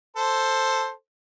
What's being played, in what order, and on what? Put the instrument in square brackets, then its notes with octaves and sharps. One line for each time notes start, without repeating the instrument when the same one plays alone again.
[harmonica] A4 C5